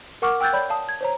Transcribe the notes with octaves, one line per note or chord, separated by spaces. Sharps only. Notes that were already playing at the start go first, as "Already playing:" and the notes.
A#4 F#5 C#6 D6 F6
G5 E6 F#6 G6 A6
C#5 D5 B5 G6
F5 A5 D#6
G#6
C5 C#5 A#5